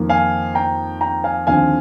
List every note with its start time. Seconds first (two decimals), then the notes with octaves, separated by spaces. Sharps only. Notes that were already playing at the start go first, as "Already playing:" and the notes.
Already playing: F2 D#3 A#3
0.09 F5 G#5
0.55 G5 A#5
1.01 G5 A#5
1.24 F5 G#5
1.47 D#2 D3 F3 C4 F5 G#5